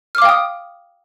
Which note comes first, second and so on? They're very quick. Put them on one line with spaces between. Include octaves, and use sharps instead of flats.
F6 D6 F5 G5 D#6